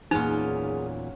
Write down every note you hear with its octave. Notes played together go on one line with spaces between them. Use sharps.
E2 A#2 F#3 C#4 D#4 F4 G#4